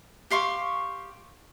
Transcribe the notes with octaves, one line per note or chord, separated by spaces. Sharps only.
G4 F5 C6 C#6